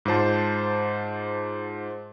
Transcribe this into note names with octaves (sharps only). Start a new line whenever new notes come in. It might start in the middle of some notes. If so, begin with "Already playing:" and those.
G#2 F4 C5 A5